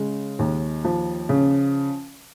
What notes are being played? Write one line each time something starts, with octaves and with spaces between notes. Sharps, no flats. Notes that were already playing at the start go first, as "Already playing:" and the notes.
Already playing: C#3 G#3
D#2
F3
C#3